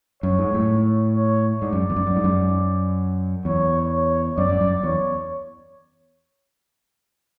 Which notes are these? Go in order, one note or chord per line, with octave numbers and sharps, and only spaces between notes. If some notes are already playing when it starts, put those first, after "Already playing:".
F#2 C#5
G#2
A2
C#5
G#2 D5
F#2
E2
F#2
F#2
G#2
F#2
E2 C#5
C#5
F#2 D5
F#2
F#2
E2 C#5